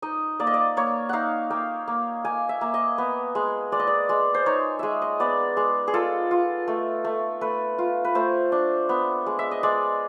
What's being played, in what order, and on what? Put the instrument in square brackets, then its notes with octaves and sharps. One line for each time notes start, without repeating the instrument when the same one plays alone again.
[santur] D#4 D#5
A#3 D5
D#5
D5
A#3 C#5
D#4 F5 F#5
A#3 G5
A#3
A#3 G#5
E5
A#3
D#5
B3
G#3
G#3 D5
D#5
D5
G#3
C5
D#4 C#5
G#3 D#5 E5
D#5
B3 D5
G#3
G#4
F4 A4
F4
A3
A3
A3 B4
F4
B4
A3 C5
D4
B3
G#3
E5
D#5
G#3 D5